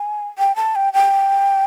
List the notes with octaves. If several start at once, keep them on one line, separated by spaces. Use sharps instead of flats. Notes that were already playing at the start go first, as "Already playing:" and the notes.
Already playing: G#5
G5
A5
G5
G5